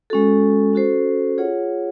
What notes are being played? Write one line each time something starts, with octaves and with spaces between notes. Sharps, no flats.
G#3 C#4 F#4 A4
C#4 F#4 A4 C5
F4 G#4 C#5 F#5